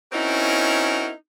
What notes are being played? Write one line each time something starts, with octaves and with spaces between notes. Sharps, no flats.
C4 C#4 D#4 E4 F#4 A#4